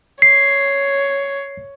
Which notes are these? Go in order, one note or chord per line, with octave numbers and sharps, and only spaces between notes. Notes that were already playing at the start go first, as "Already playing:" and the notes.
C#5 C7